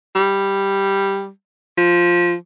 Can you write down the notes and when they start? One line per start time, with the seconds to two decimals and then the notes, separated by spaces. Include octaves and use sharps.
0.15 G3
1.77 F3